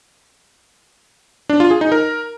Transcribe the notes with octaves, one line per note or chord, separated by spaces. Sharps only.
D4
F4
G#4
D#4
A#4